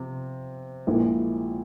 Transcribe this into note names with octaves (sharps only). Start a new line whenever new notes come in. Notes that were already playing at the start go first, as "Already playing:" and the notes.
Already playing: C3 F3
A#1 A#2 G#3 E4